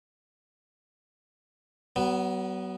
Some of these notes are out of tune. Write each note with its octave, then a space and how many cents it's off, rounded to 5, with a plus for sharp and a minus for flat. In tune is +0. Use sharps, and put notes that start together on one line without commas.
F#3 +40 B3 +0